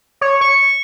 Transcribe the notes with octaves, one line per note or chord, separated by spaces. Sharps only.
C#5
C#6